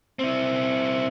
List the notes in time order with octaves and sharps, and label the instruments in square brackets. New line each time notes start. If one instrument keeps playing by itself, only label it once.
[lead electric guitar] C4 E4